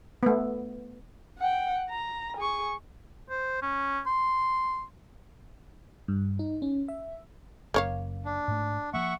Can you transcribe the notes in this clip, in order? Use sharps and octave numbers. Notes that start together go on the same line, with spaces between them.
A3 B3
F#5 G5
A#5
G#4 C#6
C5
C#4
C6
G2
D#4
C#4
E5
F#1 F#2 A#3 C#5 F5
D4
G#2 A3
F3 A#3 E5 F#5 C#6